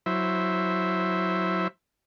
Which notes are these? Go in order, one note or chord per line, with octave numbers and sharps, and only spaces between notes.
F#3 E4 C5 E5